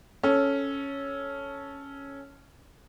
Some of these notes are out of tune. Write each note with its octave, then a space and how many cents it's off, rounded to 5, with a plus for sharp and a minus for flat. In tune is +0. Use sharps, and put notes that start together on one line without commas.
C#4 +0 A4 -10